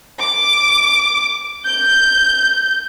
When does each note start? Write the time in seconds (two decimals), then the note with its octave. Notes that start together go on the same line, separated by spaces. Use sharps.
0.19 D6
1.65 G6